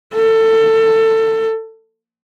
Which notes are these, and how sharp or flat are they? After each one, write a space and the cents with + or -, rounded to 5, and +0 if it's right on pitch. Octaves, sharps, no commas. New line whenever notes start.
A4 +20